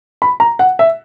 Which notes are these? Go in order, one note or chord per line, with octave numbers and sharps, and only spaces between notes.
B5
A#5
F#5
E5